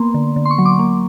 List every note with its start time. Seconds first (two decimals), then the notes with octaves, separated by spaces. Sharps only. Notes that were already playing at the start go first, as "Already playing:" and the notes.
Already playing: A#3 B3 C6
0.14 D3
0.36 D3
0.45 C6
0.51 C#6
0.58 F#3
0.65 D6
0.79 A#3